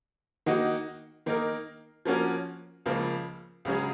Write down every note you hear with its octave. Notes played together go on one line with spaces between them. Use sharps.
D#3 A#3 D#4 F#4
D#3 A#3 D#4 A#4
F3 A#3 C#4 F#4 A#4
C#2 C#3 F3 A#3
C#2 C#3 F#3 C#4 G#4